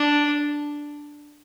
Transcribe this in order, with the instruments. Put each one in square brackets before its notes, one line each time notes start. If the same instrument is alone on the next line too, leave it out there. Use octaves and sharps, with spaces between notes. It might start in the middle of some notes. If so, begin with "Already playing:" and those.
Already playing: [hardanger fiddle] D4